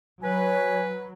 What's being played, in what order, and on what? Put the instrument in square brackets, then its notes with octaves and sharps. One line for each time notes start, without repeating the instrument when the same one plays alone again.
[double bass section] F#3 [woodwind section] B4 [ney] C#5 [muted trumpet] G#5